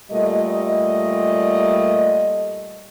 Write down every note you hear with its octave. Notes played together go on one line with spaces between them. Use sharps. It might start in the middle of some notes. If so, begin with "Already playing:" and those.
A#2 G3 A3 D#5